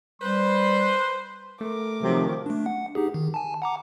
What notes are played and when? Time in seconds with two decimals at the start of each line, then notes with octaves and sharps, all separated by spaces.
0.22 G3 B4 C5 C6
1.61 A3 A#4 D6
2.03 C3 D#3 F3 F#3
2.46 A3 D4
2.66 F#5
2.95 D#4 G4 G#4
3.14 D#3
3.34 G#5 A5
3.62 F#5 A#5 D6